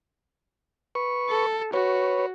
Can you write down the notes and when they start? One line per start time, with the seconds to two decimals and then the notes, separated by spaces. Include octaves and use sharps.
0.95 B4 C#6
1.30 A4
1.73 F#4 B4 C#5